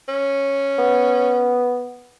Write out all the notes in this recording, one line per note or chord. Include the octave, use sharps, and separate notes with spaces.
C#4
B3